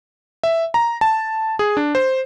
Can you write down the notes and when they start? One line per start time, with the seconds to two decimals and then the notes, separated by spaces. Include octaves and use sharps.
0.43 E5
0.74 A#5
1.01 A5
1.59 G#4
1.77 D4
1.95 C5